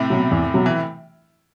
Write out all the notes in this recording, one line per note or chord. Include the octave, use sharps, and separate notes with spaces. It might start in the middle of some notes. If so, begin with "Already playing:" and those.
Already playing: A2 C3
B2 F#3
E2
B2 F#3
E3